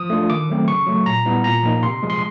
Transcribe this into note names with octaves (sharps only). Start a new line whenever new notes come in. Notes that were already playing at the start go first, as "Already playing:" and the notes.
Already playing: F3 D#6
A3 D4 F4
D#3 D6
F#3 A3 C4
C#3 C#6
F#3 A3
A#2 A#5
G3 B3 E4
A#2 A#5
F3 A#3 D#4
C3 C6
F3 G#3
C6